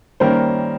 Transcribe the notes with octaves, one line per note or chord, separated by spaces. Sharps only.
D#3 G3 A#3 C#4 A#4 C5